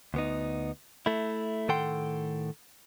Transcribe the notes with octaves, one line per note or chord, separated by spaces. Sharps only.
D2 B3 D#4
A3 E4
A2 D#3 A4 F#5 G5 C6